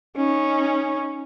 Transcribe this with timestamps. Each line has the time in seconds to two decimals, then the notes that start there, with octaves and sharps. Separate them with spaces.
0.17 C#4 D#4